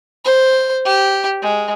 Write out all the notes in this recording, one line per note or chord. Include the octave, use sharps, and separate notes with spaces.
C5
G4
G#3